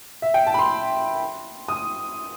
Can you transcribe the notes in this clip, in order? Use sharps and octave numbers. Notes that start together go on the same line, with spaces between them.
E5
G5
A5
B5
C6
D#6